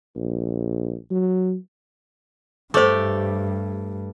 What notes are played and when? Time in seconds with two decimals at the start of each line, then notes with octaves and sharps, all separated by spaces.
0.15 A#1
1.11 F#3
2.74 G2 A3 G4 C5 D6